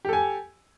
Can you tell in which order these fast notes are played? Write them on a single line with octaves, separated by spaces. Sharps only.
G4 A4 G#5